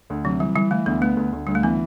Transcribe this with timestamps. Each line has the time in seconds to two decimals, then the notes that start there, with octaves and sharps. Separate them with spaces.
0.10 D2
0.24 C3 F#3
0.40 E3 G3
0.56 E3 G3
0.71 E3 A3
0.86 D2 B3
1.01 A3 B3
1.17 D2
1.33 D2
1.47 D2 G3
1.55 A3
1.63 E3 B3